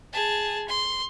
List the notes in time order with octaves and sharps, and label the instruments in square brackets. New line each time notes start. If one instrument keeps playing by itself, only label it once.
[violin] G#4 A5
C6